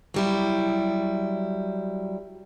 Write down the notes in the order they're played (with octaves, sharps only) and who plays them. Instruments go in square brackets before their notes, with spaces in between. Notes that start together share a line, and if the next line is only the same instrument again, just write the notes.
[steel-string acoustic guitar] F#3 G3 E4